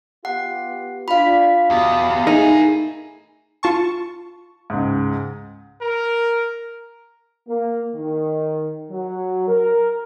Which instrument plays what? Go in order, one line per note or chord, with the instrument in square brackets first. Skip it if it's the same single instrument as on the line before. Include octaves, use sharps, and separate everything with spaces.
[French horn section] B3 F4 G4 [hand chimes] F#5
[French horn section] D4 F4 [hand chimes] F5 B5
[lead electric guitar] E2 B3 [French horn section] B2 G4
[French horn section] A3 E4 G#4 [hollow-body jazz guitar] D#4 [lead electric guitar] A#4 G#5
[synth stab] F4 A5 C#6
[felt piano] C#2 G#2
[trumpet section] A#4
[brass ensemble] A#3
D#3
F#3
A#4